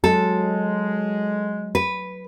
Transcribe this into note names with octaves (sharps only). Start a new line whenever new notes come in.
F#3 G#3 A4
B4